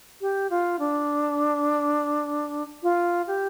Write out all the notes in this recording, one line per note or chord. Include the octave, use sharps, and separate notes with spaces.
G4
F4
D4
F4
G4